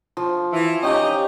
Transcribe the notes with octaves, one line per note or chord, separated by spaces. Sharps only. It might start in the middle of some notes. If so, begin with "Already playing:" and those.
F3
E3
C#4 D#4 G4 D#5